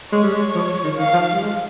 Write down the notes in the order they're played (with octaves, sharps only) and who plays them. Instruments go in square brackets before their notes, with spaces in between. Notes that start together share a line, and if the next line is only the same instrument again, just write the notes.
[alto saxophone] G#3 [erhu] C#5
[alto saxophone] G3
G#3
F3
D#3
[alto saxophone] D#3 [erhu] F5
[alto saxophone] F3
G3
G#3